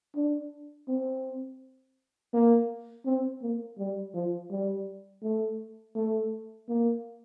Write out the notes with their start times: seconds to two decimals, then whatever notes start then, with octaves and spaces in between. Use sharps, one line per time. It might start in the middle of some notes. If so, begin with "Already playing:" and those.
0.15 D4
0.88 C4
2.33 A#3
3.05 C4
3.42 A#3
3.78 G3
4.14 F3
4.50 G3
5.23 A3
5.96 A3
6.68 A#3